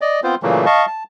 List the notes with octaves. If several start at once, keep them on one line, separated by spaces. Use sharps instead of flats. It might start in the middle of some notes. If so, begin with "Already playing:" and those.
D5 D#5
B3 C4 F4 C5
A#2 C#3 E3 F#3 A3 A#3
D#5 F5 A5 C#6
A5